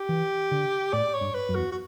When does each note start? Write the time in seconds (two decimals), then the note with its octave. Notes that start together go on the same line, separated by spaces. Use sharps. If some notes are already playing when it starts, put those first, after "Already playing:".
Already playing: G4
0.09 E3
0.51 D3
0.93 A2 D5
1.14 C#5
1.21 G2
1.34 B4
1.49 F#2
1.55 E2 F#4
1.72 F#4